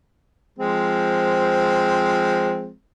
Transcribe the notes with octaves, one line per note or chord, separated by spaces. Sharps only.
F3 G#3 C4